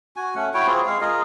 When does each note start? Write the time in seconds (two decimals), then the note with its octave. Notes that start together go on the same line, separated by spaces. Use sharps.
0.16 F#4 G#5
0.35 A3 C#4 F#5
0.54 E4 F#4 C#5 G5
0.67 C4 F4 G#4
0.86 G#3 F5
1.01 F4 G#4 A#4 D#5